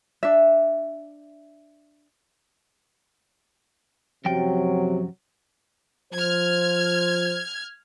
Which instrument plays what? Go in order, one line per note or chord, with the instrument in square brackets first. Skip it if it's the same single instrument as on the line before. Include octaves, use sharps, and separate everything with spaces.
[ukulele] D4 E5
[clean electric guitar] F#2 F3 G5 [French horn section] C3 F#3
[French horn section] F3 C5 [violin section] F6 G#6